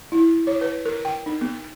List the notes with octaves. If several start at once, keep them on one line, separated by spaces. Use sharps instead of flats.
E4
C#5
B4
A#4
G5
D#4
B3